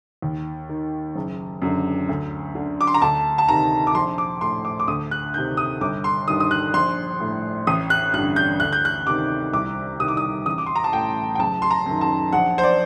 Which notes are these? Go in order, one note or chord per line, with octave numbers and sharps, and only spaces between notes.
D#2
D#3
F#1
F#2 D3
D2
D3
D6
C6
A#5
D2 A5
A5
C3 D#3 A#5
D6
A#1 C6
D6
A2 C6
D6
D6
D2 D#6
F#6
C3 D#3 G6
D#6
G1 D6
C6
G2 D#3 D#6
D#6
F#6
A#1 C6
A2
A1 D#6
F#6
G2 D3 F#6
G6
D2 F#6
G6
F#6
C3 D#3 D6
C2 D6
C3 D#3 D#6
D6
D#6
A1 D#6
D6
C6
A#5
A5
A2 G5
G5
F#1 A5
C6
A#5
F#2 D#3
A5
A#1 F#5
C5
D5